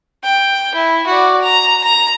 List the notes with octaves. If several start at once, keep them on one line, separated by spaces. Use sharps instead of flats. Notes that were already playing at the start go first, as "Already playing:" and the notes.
G5
E4
F#4 D5
A#5
A#5